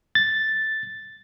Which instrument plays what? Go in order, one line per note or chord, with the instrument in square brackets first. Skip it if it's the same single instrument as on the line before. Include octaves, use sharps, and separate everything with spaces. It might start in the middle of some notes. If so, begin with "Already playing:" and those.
[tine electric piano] A6